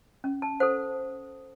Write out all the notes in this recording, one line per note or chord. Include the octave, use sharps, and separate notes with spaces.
C#4
A5
A4 C5 F#5